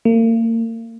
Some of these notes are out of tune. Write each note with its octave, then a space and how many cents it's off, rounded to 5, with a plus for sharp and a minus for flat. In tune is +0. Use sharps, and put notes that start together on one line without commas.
A#3 -35